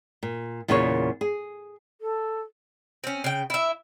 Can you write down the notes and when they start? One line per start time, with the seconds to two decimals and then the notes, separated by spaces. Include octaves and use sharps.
0.23 A#2
0.68 E2 A#2 C#3 A#3 A4 C#5
1.21 G#4
2.01 A4
3.04 C4 C#4
3.24 C#3 G5
3.50 E4 E5